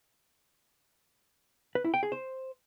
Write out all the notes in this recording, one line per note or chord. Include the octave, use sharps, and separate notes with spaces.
B4
E4
G5
G#4
C5